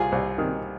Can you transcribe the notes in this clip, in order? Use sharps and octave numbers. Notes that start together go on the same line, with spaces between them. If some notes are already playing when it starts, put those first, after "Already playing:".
Already playing: C2 F4 G#4
C2
D#3